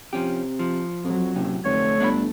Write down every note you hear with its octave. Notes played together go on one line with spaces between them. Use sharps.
C3 F3 C#4 G4
F3
F2 F#3
F#1 A2 C3
F1 D2 A3 C#5
G1 D4 D5 B5